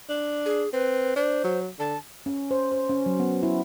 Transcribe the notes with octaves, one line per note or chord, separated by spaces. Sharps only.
D4
G#4
C4 B4
D4 C5
F#3
D3 A5
C#4
C5
C5
C#4
F#3
B3
E4